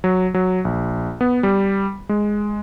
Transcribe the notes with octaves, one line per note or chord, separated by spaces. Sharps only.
F#3
F#3
A#1
B3
G3
G#3